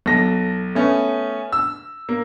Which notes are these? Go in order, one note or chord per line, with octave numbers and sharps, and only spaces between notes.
B1 A4 A#6
A3 B3 C#4
E6
A#3